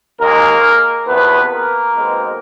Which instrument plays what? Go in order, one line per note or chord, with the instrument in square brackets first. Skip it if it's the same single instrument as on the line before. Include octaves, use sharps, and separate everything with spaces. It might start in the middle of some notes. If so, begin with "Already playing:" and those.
[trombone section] D#2 D#3 G#3 A#3 A#4
E2 C3 F3 B3 B4
A#3 A#4
B1 B2 G#3 C4